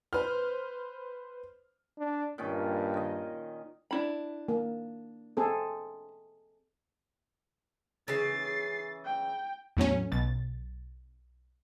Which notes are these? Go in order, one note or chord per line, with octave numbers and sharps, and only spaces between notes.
B4 C5 F6
D4
G2 A#2 D#3 C#4
D#3 D#5
D4 E4 B5
A#3
C4 G#4 A4
C#3 E3 A6 C7
G5
E2 A2 F#3 C#4
B1 A6